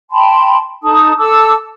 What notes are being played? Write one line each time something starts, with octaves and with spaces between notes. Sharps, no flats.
G5 A5 B5 C6
D#4 A4 A5 D#6
A4 A5 D6 E6